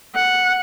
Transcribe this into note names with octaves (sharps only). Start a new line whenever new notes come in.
F#5